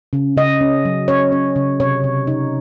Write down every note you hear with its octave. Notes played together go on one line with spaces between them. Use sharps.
C#3
C#3 D#5
C#4
F#3
C#4 C#5
C#4
C#3
C3 C#5
C3
D#4